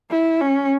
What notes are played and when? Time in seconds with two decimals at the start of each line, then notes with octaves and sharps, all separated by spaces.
0.11 E4
0.41 C#4